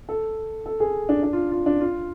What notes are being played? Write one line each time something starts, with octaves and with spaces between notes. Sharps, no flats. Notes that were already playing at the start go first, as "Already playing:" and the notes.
A4
A4
G#4
D4
D4
F4
F4
D4
F4